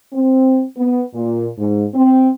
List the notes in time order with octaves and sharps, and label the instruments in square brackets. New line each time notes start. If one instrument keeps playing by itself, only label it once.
[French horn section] C4
B3
A#2
G#2
C4